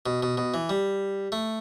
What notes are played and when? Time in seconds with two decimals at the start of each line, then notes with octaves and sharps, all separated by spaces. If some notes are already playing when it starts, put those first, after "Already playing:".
0.06 B2
0.23 B2
0.37 B2
0.54 E3
0.69 G3
1.32 A3